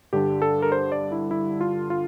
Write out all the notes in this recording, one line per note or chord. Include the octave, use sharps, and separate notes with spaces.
G2 D3 G3 D4 G4
A4
A#4
C5
D5
E4
E4
F4
F4